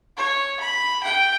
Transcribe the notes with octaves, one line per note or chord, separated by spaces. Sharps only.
C#5
B5
G5